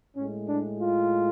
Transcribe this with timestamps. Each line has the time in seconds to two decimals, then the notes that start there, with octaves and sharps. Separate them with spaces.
0.15 A2 G#3 C#4
0.46 D4
0.77 F4